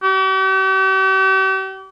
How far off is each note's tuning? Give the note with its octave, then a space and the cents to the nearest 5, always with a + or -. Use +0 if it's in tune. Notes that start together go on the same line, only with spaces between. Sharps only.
G4 -45